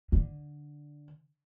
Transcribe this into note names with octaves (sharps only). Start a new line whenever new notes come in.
D3